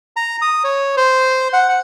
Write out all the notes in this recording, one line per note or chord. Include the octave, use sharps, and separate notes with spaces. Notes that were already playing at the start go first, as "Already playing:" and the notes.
A#5
D#6
C#5
C5
F#5
F#5